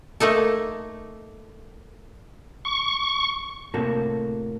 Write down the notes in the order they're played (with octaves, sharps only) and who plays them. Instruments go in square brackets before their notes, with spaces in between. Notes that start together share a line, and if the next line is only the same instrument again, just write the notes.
[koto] A3 A#3 D#4 A4
[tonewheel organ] C#6
[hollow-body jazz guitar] A2 C3 A#3 F#4 A4